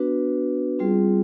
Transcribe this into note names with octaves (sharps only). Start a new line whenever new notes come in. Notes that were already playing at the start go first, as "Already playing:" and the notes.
Already playing: B3 D4 F#4 B4
G3 C4 F4 G#4